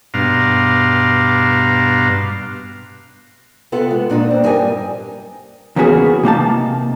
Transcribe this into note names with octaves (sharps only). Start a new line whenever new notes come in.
G2 B2 D4 F5 A#5 C6
C3 B3 F4 A4 F#5
G#3
A#2 D4 D#4
C4
G2 G3 A#4 D#5 G#5
E2 C#3 A#3 B3 F#4 G#4
C3 A#3 D#4 A5